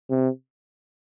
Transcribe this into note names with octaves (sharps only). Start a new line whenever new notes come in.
C3